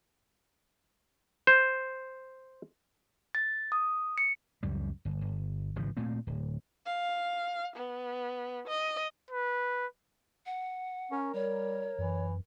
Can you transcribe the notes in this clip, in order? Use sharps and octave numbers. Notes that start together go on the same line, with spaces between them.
C5
A6
D#6
C#7
C#2 F#2 G3
G1
G1
G#1 C#3 E3 F3
A#2 A3 C4
D1
F5
B3
D#5
B4
F#5
C#4 A#4
G3 C#5
F#2 E3